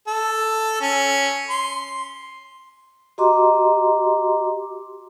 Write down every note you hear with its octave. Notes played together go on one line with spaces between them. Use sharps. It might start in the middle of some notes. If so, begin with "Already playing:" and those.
A4
C#4
C6
F#4 G4 D#5 A#5 C6 D6